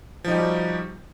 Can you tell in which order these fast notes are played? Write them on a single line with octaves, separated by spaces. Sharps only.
F3 D#4 G4 G3 F#4